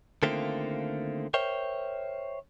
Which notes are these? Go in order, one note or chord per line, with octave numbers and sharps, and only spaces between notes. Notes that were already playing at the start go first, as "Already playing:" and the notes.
D3 D#3 A3 A#3 C4 F4
A#4 C5 C#5 E5 G5